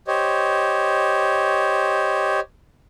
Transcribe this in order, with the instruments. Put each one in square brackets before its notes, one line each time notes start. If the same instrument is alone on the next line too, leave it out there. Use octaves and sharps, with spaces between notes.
[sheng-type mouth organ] G4 C5 C#5 D#5